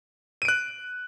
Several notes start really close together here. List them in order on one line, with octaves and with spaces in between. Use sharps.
D#7 D7 F#6